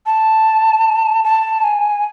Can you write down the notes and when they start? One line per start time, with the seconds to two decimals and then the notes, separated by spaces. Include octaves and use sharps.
0.06 A5
1.24 A5
1.64 G#5